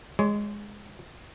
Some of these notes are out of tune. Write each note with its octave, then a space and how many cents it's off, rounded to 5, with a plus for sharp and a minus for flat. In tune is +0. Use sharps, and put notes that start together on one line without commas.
G#3 -5 C#5 +25